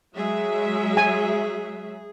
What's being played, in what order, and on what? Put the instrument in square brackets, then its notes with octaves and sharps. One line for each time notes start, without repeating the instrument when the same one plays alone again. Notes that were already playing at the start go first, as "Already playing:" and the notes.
[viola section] F#3 G#3 E5 [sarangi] G#4
[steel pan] G#5